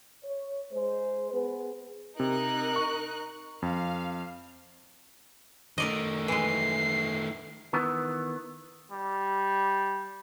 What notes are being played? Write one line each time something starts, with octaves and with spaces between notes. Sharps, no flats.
C#5
G#3 C5
B3 G#4 B4
C3 D#4 A#4 F#6
C#6
F2 F5
D#3 A3 A#4 D5 D#5
E3 G#3 C7
D#3 E3 B3
G3